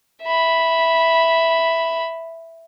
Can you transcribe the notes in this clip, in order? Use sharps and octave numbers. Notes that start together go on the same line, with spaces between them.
E5 B5